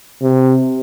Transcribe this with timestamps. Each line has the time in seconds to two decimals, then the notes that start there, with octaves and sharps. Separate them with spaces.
0.22 C3